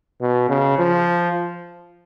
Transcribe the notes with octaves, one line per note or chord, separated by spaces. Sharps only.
B2
C#3
F3